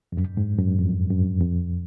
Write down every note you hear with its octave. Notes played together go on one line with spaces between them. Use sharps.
F2
F#2
G#2
F#2
F2
F#2
F2